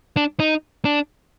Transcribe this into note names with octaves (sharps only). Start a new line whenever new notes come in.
D4
D#4
D4